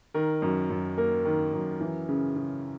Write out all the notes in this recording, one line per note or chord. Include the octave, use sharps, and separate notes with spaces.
D#3 A#4
F#2
F#2
A#3 A#4
D#3
F#2
E3
C#3
C#3